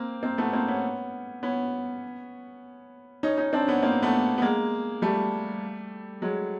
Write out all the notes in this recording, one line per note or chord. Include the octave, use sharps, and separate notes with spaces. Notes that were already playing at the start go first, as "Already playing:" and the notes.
Already playing: A#3 C4
A#3 C4
A3 B3
A#3 C4
B3 C#4
B3 C#4
C#4 D#4
C#4 D#4
C4 D4
B3 C#4
A#3 C4
A3 B3
B3
G#3 A#3
G3 A3
F#3 G#3